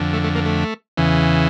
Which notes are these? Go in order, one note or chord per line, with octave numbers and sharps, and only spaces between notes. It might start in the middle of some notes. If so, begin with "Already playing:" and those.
Already playing: F2 D3
A3
A3
A#3
A3
E2 C#3 E3